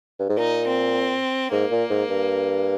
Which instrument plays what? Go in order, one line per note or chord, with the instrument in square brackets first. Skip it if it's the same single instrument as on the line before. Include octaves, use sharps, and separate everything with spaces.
[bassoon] G2
G#2
[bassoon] A#2 [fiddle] D#4
[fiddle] C4
[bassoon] G#2 [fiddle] A#3
[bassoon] A#2
G#2
G2